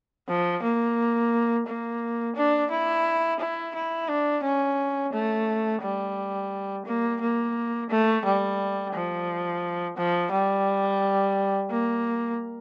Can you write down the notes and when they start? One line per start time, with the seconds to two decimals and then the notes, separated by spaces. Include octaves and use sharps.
0.28 F3
0.63 A#3
1.67 A#3
2.36 D4
2.71 E4
3.39 E4
3.75 E4
4.08 D4
4.44 C#4
5.13 A3
5.81 G3
6.86 A#3
7.21 A#3
7.90 A3
8.25 G3
8.93 F3
9.97 F3
10.32 G3
11.70 A#3